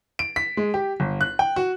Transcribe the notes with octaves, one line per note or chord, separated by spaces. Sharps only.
D7
B6
G#3
G4
G1
F#6
G5
F#4